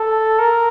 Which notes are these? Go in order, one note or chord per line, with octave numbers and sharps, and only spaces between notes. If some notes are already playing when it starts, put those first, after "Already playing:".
Already playing: A4
A#4